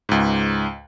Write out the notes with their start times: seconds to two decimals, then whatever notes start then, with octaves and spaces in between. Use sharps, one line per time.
0.09 C#2 G#2